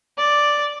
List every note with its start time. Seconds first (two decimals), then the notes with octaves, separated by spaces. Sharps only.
0.18 D5